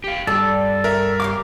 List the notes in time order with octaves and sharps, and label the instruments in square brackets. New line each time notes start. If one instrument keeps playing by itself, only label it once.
[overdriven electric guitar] G4 F5
[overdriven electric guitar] G2 [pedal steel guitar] A4 [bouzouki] D5
[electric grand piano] A#4 E5
[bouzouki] C#3 G4 F5 [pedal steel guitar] D6